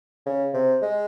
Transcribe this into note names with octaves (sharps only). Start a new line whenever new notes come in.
C#3
C3
G#3